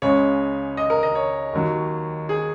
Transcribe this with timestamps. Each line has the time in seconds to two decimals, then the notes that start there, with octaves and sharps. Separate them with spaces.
0.02 C#2 C#3 G#3 C#5
0.77 D#5
0.90 A#4
1.03 D#5
1.15 C#5
1.53 D#2 D#3 F#3
2.29 G#4